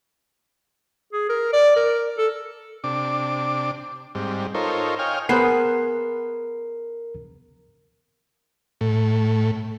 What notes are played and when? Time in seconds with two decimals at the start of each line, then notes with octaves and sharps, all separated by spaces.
1.13 G#4
1.30 A#4
1.53 D5
1.76 A#4
2.18 A4
2.84 C3 D4 D6
4.15 G#2 G3 C4
4.54 D#4 F4 A4 A#4 C5 C#5
4.99 C#5 D#5 F5 G5 G#5 F6
5.29 B3 G#4 A#4 C5 F#6 C7
8.81 A2